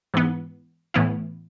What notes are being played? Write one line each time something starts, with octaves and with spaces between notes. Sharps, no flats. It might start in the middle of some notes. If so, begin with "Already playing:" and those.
G#2 E3 B3
A2 E3 B3 E4